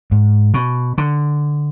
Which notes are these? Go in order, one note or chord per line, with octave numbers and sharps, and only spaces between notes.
G#2
B2
D3